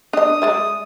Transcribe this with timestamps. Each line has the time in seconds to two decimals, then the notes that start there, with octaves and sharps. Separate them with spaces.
0.13 D4 D#5 D#6
0.42 G#3 D5 E5